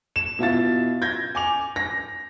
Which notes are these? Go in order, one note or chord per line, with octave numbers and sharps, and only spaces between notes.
E7
B2 E4 F4 A6
G6 G#6 A#6
G#5 D6 F7
A#6